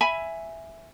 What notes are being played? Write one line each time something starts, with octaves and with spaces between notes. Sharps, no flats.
E5 G#5 B5